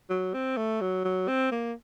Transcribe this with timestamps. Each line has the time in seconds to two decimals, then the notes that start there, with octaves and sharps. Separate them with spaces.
0.10 F#3
0.34 C4
0.57 A3
0.81 F#3
1.04 F#3
1.28 C4
1.51 A#3